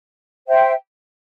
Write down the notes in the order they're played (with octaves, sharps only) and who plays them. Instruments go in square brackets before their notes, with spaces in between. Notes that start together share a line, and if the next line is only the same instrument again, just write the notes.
[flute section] C5 E5 G5